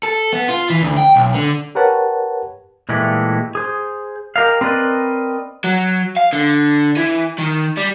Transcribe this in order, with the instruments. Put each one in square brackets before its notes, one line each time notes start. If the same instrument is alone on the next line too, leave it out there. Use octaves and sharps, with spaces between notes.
[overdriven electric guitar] A4
B3
F4
E3
D2
G5
B1
D3
[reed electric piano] G4 A#4 B4 C#5 F#5 A5
[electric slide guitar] A#2 E3 G#3 A3 G4
G#4 C5
G4 A#4 D#5 F5
C4 A#4 B4 D5 D#5
[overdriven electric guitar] F#3
F5
D3
E3
D#3
G3